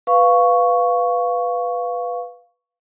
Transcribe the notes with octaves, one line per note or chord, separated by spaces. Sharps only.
B4 F5 C#6